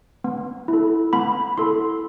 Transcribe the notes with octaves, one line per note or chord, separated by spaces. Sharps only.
B3
E4
A4
B3 B5
E4 A4 C6